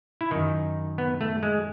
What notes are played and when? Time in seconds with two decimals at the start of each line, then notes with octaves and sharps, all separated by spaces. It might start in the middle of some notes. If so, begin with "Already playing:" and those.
0.21 E4
0.31 F#2 D#3 D#4
0.98 B3
1.21 A3
1.43 G#3